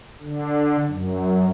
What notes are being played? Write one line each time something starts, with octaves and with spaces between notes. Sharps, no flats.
D3
F#2